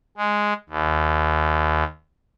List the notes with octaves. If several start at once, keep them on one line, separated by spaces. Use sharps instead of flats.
G#3
D#2